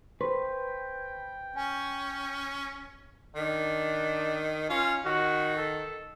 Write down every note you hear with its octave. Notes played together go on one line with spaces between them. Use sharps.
B4 C5 G5 C6 C#6
C#4 G#5
D#3 D4
C#4 F4
D#3 F#4
A4